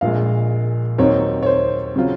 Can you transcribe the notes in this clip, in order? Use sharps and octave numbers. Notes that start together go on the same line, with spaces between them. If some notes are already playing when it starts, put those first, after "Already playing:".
A#1 A#2 G#3 F5
D#2 D#3 F#3 C4 D#4 C#5
C#5
C5
C#3 F#3 C4 F4